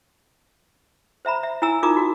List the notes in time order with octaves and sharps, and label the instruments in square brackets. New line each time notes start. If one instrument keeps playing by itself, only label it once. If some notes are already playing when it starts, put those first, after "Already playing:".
[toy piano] C5 E5 A#5 B5
E5
E4 G#5 A#5 E6
D#4 F4 A#4 A#5 D6 D#6
F#4 A#4